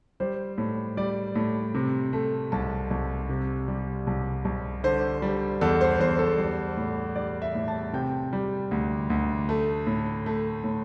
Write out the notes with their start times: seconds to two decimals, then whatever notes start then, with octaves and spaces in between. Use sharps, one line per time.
0.20 G3 C5
0.58 A2
0.97 G3 D5
1.36 A2
1.74 C3
2.13 A3
2.52 C2 A5
2.91 C2
3.29 C3
3.68 G3
4.07 C2
4.45 C2
4.84 D3 C5
5.22 G3
5.61 E2 A4
5.81 C5
6.00 E2 C5
6.19 A4
6.38 G3
6.77 A2
7.15 G3 D5
7.42 E5
7.55 A2
7.68 A5
7.93 C3 G5
8.33 G3
8.71 D2
9.10 D2
9.49 A3
9.87 A2
10.26 A3
10.64 A2